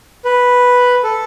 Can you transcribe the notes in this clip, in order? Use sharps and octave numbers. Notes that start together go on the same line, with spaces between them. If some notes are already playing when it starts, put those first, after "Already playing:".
B4
A4